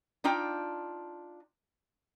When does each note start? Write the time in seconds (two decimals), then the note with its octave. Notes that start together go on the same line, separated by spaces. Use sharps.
0.24 D4 D#4 F4 G5